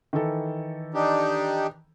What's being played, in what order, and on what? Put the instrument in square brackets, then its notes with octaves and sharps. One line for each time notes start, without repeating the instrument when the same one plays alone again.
[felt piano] D#3 E3 A4
[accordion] D4 D#4 G4